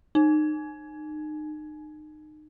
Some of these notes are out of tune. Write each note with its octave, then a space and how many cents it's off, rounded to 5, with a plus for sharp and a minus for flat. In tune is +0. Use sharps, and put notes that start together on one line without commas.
D#4 -30